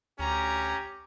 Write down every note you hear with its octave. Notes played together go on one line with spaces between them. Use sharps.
D2 C#4 G4 A#5